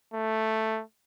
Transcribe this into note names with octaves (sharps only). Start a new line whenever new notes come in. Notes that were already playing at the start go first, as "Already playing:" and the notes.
A3